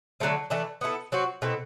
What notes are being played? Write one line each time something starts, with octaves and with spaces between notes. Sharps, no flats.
D3 F#3 A3 C4
E3 A3 D4
B3 E4 A4
F#3 C4 F#4
B2 A3 C4 E4